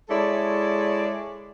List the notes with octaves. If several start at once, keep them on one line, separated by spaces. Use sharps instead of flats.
G#3 E4 A4 C#5 D5